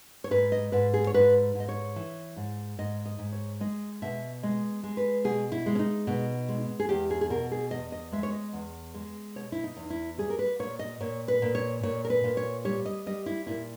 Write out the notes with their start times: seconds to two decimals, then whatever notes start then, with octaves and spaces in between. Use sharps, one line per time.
0.24 C#5
0.31 G#2 B4
0.52 D#5
0.72 G#2 B4
0.94 G#4
1.07 C#5
1.14 G#2 B4
1.55 G#2 D#5
1.69 C#5
1.96 E3
2.36 G#2
2.79 G#2 D#5
3.06 D#5
3.19 G#2
3.32 C#5
3.60 G#3 D#5
4.02 B2 E5
4.43 G#3 D#5
4.83 G#3
4.97 B4
5.24 B2 G#4
5.52 E4
5.66 G#3
5.75 C#4
5.79 D#4
6.07 B2
6.49 G#3
6.80 G#4
6.89 E2 G4
7.11 G#4
7.21 G#4
7.30 B2 A#4
7.52 G#4
7.71 E2 D#5
7.92 D#5
8.12 G#3 E5
8.23 C#5
8.33 D#5
8.53 E2
8.94 G#3
9.36 B2 C#5
9.52 E4
9.64 D#4
9.77 E2
9.90 E4
10.18 G3 G#4
10.30 A#4
10.39 B4
10.59 A#2 C#5
10.79 D#5
11.00 A#2 C#5
11.28 B4
11.42 A#2
11.55 C#5
11.83 A#2 C#5
12.05 A#4
12.10 B4
12.24 A#2
12.37 C#5
12.65 G3 C#5
12.86 D#5
13.06 G3 D#5
13.26 E4
13.47 A#2 E4